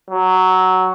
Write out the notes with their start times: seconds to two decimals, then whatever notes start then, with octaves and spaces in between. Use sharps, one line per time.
0.10 F#3